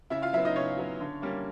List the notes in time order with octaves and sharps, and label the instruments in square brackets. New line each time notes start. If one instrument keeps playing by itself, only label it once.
[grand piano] C#3 E4 E5
F4 F5
F#3 B3 E4 E5
D#4 D#5
C#3 C#4 C#5
F#3 B3
D3
G3 A#3 C#4